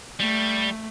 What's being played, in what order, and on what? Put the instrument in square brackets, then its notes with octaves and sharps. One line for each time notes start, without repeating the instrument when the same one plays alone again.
[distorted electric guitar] G3 [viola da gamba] A3